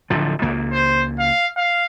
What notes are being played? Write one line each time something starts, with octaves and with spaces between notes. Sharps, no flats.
D1 D3 F3
C#2 A#3
C5
F5
F5